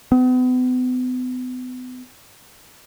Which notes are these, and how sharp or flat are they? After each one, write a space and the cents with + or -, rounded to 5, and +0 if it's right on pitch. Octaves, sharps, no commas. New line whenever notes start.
B3 +40